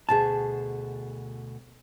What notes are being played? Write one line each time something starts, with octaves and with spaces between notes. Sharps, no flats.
D2 B2 G#4 A5